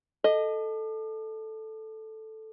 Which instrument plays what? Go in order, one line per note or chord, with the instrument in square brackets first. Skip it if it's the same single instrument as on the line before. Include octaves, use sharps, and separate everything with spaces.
[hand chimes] A4 [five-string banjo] D#5